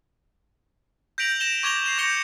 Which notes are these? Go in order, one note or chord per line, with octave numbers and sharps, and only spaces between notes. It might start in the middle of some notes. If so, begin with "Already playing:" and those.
G6 A#6 B6 D7 F7 F#7
A#6 E7 G7
C#6 D6 G#6 A#6 F7 G7
C7 E7
C#6 G6 A#6 C#7 G7